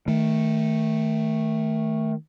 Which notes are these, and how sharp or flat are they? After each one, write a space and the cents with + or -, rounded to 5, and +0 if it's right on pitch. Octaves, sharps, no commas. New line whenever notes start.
D#3 +15 A3 +0